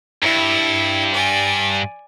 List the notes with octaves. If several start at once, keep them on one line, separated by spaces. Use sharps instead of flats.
G2 E4
D5 G#5